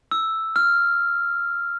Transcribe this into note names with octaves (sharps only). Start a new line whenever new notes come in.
E6
F6